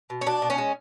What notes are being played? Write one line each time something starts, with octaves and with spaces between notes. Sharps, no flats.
B2
C#4
B2 D4
B2
C#4
G#3